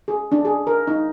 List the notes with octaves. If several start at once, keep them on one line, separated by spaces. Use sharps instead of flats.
G#4
D4
G#4
A#4
D#4